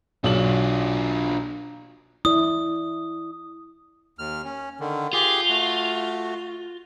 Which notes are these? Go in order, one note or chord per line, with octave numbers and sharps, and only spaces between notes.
B1 D4 F4 F#7
E4 D5 D#6
D#2 F6
C#4
D3 D#3
F4 G4 G#4
A3 F#4